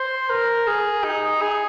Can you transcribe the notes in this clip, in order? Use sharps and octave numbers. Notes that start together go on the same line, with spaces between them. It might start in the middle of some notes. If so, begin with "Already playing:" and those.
Already playing: C5
A#4
G#4
D#4
G#4